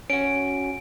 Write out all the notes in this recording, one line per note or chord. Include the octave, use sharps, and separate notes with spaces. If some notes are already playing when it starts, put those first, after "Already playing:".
C#4 F#4 D7